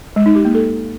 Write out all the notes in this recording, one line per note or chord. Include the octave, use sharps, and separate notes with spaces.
G#3
D#4
G4
A#3
A4